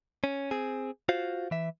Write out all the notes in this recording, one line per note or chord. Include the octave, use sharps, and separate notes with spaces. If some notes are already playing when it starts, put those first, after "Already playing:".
C#4
C4 G#4
F4 F#4 C5 F5
E3 E5